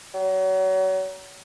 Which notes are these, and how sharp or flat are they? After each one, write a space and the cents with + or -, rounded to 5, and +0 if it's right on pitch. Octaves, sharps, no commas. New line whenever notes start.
F#3 +35